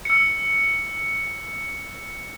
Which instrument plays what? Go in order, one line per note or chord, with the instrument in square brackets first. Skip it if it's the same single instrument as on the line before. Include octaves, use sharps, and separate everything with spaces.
[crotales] E6 C#7